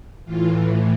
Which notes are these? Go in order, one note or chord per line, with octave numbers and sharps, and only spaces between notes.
A2 E3 F4